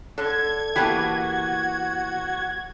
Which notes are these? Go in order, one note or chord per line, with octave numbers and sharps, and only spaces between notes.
D3 D4 A4 G#6
E3 A#3 B3 F#4 G4 B4 A5